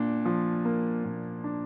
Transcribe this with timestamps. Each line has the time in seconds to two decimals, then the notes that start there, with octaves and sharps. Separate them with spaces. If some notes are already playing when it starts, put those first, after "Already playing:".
Already playing: A#2 D4
0.25 F3
0.65 A#3
1.04 A#2
1.44 D4